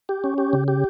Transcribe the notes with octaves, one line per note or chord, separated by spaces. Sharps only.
G4
C#4
G4
C#3
G4